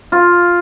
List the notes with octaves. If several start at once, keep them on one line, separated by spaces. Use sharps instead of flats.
F4